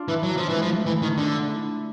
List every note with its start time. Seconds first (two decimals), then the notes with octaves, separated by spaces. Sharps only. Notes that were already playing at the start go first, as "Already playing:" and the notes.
Already playing: D4 F4
0.08 E3
0.23 F#3
0.37 F3
0.49 E3
0.55 G#3
0.62 F3
0.71 A3
0.86 E3
1.02 D#3
1.18 D3 D4
1.50 E4